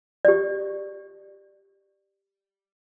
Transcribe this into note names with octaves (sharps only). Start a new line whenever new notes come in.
G4 D5